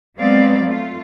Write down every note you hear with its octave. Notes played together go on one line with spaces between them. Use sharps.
F#3 G#3 B3 C4 D5 F5
A3 F4